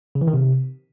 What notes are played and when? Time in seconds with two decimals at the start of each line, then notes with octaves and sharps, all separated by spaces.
0.15 C#3
0.21 E3
0.27 D#3
0.34 C3